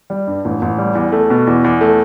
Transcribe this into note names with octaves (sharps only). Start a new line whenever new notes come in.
G3
G2
A1
A1
G3
E2
A3
B2
E2
E2
A3